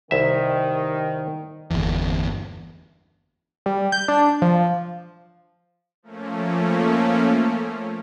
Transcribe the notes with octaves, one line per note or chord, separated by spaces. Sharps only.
C2 D#3 E5
G1 E2
G3
G6
D4
F3
F3 A3 A#3 C#4